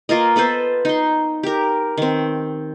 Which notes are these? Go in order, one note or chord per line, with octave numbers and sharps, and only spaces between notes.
A#3 F4 A#4 D#5
B3 A4 B4 C5
D#4 C6
G4 A#4
D#3 C4